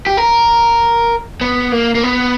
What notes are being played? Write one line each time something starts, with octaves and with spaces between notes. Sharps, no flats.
G4
A#4
B3
A#3
A#3
B3